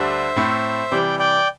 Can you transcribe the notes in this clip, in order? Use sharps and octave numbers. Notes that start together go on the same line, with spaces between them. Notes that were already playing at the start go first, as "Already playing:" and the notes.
Already playing: D2 D3 G3 D4 C5 E5
A2 A3 C4 E4
C3 E3 G3 D5 G5
D5 G5